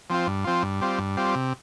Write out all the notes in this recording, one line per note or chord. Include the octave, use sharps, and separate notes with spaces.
F3 C4 F4
G2
F3 C4 F4
G2
G3 C4 F4
G2
G3 C4 F4
C3